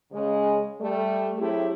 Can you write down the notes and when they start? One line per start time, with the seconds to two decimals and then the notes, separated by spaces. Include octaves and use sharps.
0.12 C#3 G#3
0.80 G3 A3
1.38 F#3 A3 C4 E4 G4 G#4